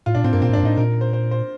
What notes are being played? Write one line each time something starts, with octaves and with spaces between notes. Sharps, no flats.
A2 F4
A#2 D4
A2 C4
G2 A#3
A#2 C4
A2
G2 D4
A2 D#4
A#2 A#4
C5
C5
C5